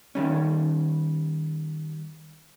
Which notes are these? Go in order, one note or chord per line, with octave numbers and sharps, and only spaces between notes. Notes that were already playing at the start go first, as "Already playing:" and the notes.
D#3 G3 C#4